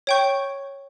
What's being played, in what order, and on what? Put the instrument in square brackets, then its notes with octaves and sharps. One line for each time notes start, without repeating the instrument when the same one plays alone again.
[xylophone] C#5 G5 C#6 G6